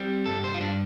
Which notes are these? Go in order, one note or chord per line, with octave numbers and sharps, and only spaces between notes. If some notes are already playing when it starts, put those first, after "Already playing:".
Already playing: G3 C4
G2 A4
C5
F4
G2 D4